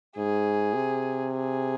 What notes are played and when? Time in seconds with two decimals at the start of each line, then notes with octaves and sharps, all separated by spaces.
0.17 G#2 G#4
0.75 C3
1.33 G#4